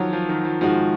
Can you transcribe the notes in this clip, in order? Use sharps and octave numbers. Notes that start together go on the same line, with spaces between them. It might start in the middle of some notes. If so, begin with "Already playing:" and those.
Already playing: D#3 F3 F#3
F3
D#3
F3
G#2 D#3 F3 G#3 D#4 F#4